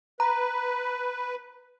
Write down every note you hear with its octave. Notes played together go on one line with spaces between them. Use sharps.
B4 A#5